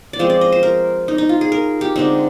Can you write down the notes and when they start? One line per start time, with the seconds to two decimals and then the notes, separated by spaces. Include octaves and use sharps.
0.13 D5
0.19 F3 G#3 C4 C5
0.30 D5
0.41 D#5
0.52 C5
0.63 A#4
1.08 D#4
1.18 D#4
1.29 F4
1.41 G#4
1.52 A#4
1.81 G4
1.96 D3 G#3 C4 D#4